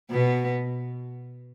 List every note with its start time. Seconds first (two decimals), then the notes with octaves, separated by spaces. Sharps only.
0.11 B2 B3